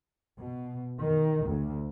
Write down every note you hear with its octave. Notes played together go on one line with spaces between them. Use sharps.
B2
D#3
D2